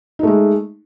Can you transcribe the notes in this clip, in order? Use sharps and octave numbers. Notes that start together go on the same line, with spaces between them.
G#3 A3 D#4